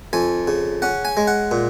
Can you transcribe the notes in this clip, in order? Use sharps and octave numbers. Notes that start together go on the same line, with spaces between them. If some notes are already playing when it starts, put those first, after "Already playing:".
F2 G#5
C#3
C#4 F#5
G#5
G#3
F#5
A#2